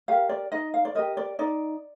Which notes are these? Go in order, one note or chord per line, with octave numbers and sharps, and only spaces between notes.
G4 A#4 F5
D5
D#4 D#5
F5
D5
G4 A#4 D#5
D5
D#4 D5